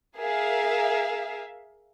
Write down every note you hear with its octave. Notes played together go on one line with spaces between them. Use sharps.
G#4 A#4 E5 F5